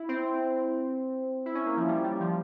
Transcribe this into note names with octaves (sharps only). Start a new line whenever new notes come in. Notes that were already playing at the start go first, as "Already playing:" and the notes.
Already playing: E4
C4
E4
C#4
A#3
F3
G3
G3
F3